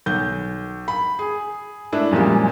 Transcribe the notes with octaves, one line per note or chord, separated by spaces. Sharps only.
B1 G6
B5
G#4
A3 D4 E4
F#2 A#2 F3 G3 G#3